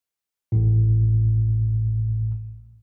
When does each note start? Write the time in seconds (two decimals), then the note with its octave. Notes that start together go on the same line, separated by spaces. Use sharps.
0.52 A1 A2